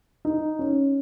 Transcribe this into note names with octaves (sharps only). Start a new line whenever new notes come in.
D#4
C#4